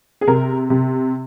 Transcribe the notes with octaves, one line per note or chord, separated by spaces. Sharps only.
G#4
C3 A#4
C3